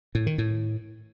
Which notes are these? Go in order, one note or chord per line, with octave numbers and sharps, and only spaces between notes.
A2
D#3
A2